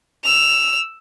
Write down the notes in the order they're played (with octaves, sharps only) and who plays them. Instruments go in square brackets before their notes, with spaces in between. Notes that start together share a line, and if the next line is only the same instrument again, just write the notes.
[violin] E6 F7